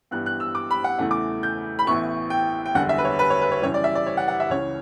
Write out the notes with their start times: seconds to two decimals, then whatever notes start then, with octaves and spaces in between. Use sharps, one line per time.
0.11 G2 E3 G3 B3 F#6
0.26 F#6
0.40 E6
0.55 D6
0.71 B5
0.84 F#5
0.99 E2 C#3 E3 A3 E4 F#5
1.11 D6
1.43 G6
1.79 B5
1.87 A1 A2 E3 B3 E4 C#6
2.30 G5
2.66 G5
2.75 F#1 E2 D3 G3 F#5
2.89 E5
2.98 B4
3.05 C#5
3.19 B4
3.30 C#5
3.41 B4
3.51 C#5
3.62 F#2 C#3 E3 G3 C#5
3.74 D5
3.84 E5
3.95 D5
4.06 C#5
4.17 F#5
4.28 F#5
4.40 E5
4.50 C#2 C#3 E3 C#5